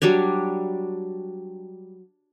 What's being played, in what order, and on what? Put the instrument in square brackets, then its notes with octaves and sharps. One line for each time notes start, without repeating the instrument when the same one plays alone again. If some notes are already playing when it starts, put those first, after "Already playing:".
[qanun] F#3 G3 D4 C#5